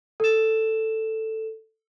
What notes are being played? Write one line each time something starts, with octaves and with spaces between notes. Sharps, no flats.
A4 E7